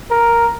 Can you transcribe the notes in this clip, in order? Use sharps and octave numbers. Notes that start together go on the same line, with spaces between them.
A#4